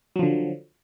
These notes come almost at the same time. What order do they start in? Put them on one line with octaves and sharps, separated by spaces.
F#3 F3 D3